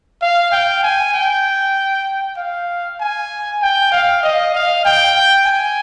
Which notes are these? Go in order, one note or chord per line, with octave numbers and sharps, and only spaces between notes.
F5
G5
G#5
G5
F5
G#5
G5
F5
D#5
F5
G5
G#5